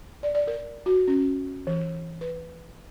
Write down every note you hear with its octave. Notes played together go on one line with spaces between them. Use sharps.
D5
D5
A#4
F#4
C#4
E3
B4